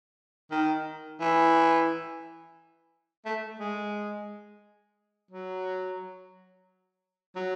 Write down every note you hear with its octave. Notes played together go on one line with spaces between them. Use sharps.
D#3
E3
A3
G#3
F#3
F#3